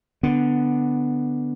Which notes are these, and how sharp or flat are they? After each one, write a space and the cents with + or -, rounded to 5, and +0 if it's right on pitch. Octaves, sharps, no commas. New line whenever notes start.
D3 +0 B3 +0